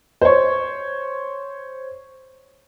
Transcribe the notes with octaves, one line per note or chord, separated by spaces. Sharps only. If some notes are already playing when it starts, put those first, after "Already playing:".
C5 C#5